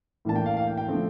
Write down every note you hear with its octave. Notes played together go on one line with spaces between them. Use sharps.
A2 E3 A#3 D4 A5
G5
F5
F5
G5
G5
D3 F3 A3 C4